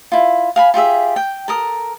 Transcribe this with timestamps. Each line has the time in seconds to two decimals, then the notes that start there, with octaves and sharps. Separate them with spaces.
0.12 E4 F4
0.56 F5 G#5 B5
0.74 F4 G4 G#4 E5
1.16 G5
1.48 A4 A#4 D#6